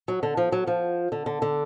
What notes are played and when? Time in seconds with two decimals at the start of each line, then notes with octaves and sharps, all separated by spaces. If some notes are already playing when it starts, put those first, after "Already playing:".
0.08 F#3
0.23 D3
0.37 F3
0.52 F#3
0.67 F3
1.12 D3
1.26 D3
1.42 D3